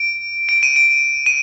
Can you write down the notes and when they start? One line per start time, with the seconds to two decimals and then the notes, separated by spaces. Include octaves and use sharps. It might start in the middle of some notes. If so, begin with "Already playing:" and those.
Already playing: D7
0.49 D7
0.63 D#7
0.76 D7
1.26 D#7